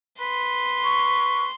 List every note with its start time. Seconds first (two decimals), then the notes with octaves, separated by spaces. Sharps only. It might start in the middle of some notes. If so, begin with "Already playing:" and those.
0.20 B4 C6
0.84 C#6